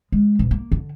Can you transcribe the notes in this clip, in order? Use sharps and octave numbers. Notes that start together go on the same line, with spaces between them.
G#3
D#1
A#3
D3